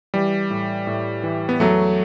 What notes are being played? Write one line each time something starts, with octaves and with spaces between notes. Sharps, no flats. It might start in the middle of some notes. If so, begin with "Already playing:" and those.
E3 G3
A2
A2
E3
B3
E2 F#3 A3